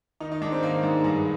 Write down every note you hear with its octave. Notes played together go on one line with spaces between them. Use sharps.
D#3 D#4
D#4
G#2 D4
C4
D#3 A#3
G#2
G2 G#3